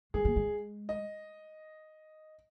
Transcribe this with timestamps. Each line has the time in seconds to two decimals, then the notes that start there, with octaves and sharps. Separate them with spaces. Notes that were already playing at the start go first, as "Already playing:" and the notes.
0.14 G#3 G#4
0.25 A#3
0.36 G#3
0.89 D#5